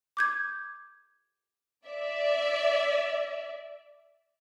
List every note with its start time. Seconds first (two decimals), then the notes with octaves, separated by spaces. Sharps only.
0.17 D6 G6 G#6
1.87 D5 E5